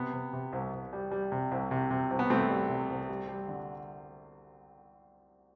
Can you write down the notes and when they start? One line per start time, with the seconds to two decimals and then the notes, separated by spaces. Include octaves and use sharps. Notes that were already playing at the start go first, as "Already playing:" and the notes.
Already playing: C3 B3
0.13 C3
0.33 C3
0.53 C2
0.73 C2
0.93 G3
1.11 G3
1.32 C3
1.51 C2
1.71 C3
1.91 C3
2.11 C2
2.19 B3
2.30 C2 A3 C4
2.50 G3
2.70 C3
2.90 C2
3.09 G3
3.28 G3
3.48 D3